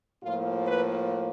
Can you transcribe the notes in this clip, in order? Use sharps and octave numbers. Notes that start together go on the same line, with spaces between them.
A2 F3 A#3 F4
B4